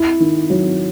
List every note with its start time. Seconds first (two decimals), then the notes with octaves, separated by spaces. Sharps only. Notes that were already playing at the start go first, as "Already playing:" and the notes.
Already playing: E4
0.20 D#3
0.50 F#3